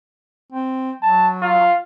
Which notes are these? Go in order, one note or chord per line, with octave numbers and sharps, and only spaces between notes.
C4
F#3 A5
F4